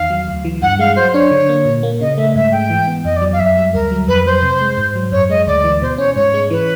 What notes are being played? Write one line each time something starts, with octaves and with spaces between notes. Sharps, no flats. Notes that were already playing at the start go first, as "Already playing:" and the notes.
Already playing: E2 D#3 F5
F#3
D2
E3
G2 F#5
G#3 F5
F#3 C5
D4 C#5
D3
A#3
A#2
A#3
C#3 D#5
A3 E5
G#2 E5
G#3 G5
E3
B3
F2 D#5
D5
F#3
F5
F#2 E5
G3
D2 A#4
F#3
F2 B4
F#3 C5
C3
G#3
G#2
F#3
F#2 C#5
G#3 D#5
D2 D5
E3
B2 C5
C#4 C#5
G#2 C#5
G#3
E3 B4